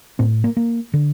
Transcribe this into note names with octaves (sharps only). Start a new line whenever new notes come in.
A2 C4
A#3
A#3
D3